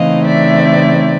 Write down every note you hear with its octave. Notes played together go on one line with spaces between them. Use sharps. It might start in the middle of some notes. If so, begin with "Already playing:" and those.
Already playing: C#3 E3 A3 C4 D#4 D#5 F5
D5 E5